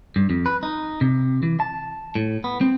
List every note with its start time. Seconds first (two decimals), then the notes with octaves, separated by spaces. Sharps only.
0.16 G2
0.30 F2
0.46 B4
0.63 D#4
1.01 C3
1.43 E3
1.60 A5
2.15 A2
2.44 B3
2.61 C4